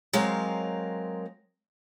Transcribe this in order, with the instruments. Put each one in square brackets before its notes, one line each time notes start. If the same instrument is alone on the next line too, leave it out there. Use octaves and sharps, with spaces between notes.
[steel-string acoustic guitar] F#3 G#3 C4 A#4 F5